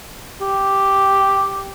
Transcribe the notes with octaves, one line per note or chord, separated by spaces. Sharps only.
G4